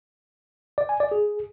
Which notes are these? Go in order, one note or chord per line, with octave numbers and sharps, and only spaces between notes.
D5
G#5
D5
G#4